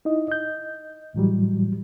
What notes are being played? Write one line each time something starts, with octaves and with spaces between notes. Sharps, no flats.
D#4 E4 D#5
D#5 G6
A2 E3 F#3 G3